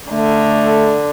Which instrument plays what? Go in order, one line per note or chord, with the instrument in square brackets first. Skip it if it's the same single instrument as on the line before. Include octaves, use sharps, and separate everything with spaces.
[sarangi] D3 [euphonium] A3